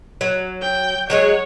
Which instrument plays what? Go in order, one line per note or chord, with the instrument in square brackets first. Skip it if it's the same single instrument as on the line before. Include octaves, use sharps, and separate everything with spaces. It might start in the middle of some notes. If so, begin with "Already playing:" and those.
[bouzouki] F#3
[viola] G5
[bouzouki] F#3 G#3 G#4 [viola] C#5